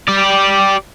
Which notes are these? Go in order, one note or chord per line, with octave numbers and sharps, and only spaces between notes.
G4 D5